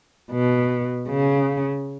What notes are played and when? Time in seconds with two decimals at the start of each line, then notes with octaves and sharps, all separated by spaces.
0.32 B2
1.08 C#3